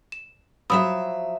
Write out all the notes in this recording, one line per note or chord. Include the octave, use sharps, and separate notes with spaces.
E7
F3 F#3 E5 B5 D#6 E6